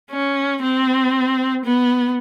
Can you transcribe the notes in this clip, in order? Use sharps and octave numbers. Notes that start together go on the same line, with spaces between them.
C#4
C4
B3